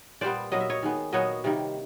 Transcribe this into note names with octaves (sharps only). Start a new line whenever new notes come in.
A#2 G3 B3 C5 D5
A#2 F#3 B3 D#5
E5
C#5 D#5
D#3 G#3 B3
A#2 F#3 B3 C#5 D#5
C3 D#3 G3 A#3